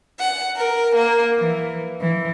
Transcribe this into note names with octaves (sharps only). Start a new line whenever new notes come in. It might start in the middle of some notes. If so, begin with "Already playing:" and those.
F#5
A#4
A#3
E3
E3